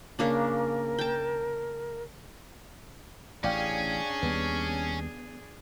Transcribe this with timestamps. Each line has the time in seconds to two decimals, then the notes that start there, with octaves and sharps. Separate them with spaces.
0.19 C#3 A#3 D4 A#4
0.99 G5 A5
3.44 A1 C#4 D4 G#4 D5 F5 G5
4.22 D#2 G3 B3